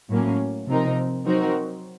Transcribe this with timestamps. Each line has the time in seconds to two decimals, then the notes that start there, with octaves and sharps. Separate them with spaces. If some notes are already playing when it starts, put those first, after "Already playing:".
0.09 A2 F#3 A#3 C#4
0.68 C3 F3 C4 D#4 A#4
1.25 F#3 C4 D#4 F#4 A#4